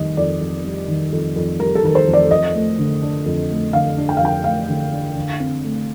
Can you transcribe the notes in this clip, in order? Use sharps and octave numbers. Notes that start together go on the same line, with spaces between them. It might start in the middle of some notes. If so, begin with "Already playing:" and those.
Already playing: F2 D#3 G3 D#5
F2 D5
F2
G3
D#3
F2
F2
G3 A#4
A4
D#3 A#4
C5
F2
D5
F2 D#5
A3
D3
D4
F2
A3
D3 F5
D4
G5
F5
F2 G5
A3 F5
D3
D4
D3
C4
A3